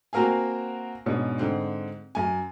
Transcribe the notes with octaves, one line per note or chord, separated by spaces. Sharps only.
A#3 C4 F#4 A#4 F5 G#5
G#2 B2 C#4 D4
G#2 D3 C4
F#2 G#5